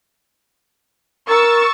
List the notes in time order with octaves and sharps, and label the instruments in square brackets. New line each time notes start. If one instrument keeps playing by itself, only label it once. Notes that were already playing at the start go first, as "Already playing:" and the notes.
[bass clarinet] A#4 [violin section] C#6 E6 A6